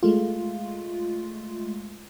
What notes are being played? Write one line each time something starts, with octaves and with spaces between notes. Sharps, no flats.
G#3 A3 F4